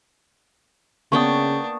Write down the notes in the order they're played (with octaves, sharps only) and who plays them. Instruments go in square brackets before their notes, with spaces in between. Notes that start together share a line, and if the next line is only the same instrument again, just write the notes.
[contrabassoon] C#3 [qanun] A#3 B3 G5 [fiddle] D4 [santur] C#6 D#6